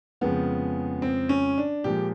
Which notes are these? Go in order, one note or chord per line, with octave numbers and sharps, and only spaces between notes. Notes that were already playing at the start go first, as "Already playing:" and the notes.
F2 C#3 F3 G#3 B3
C4
C#4
D4
A#2 F3 G#3 G4